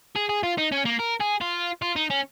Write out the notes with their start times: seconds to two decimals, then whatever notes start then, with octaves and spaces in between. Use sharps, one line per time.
0.16 G#4
0.29 G#4
0.43 F4
0.58 D#4
0.72 C#4
0.85 A#3
0.99 A#4
1.20 G#4
1.41 F4
1.82 F4
1.96 D#4
2.10 C#4